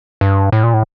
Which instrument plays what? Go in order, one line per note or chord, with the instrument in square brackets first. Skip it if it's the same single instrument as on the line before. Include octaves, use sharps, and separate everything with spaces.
[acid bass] G2
A2
A#2
A2